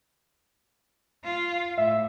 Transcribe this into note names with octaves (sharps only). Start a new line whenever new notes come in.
F4
A2 E5